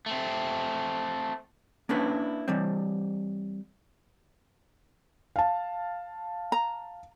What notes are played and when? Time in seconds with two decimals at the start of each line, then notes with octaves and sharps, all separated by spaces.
0.06 A3 C4
1.89 A#3 C#4 D4 E4 B4
2.48 E3 G3 C4
5.36 F5 A5
6.52 A#5